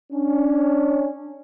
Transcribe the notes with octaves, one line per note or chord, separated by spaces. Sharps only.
C#4 D4